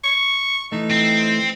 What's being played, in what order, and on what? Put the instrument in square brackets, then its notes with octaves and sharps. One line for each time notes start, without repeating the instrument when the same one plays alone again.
[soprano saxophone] C#6
[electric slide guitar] E3 A3 [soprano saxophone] D#4
[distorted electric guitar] C4